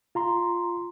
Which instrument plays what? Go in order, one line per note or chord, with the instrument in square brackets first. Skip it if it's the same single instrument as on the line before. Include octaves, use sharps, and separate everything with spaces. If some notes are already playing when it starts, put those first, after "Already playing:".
[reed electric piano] F4 A#5 C6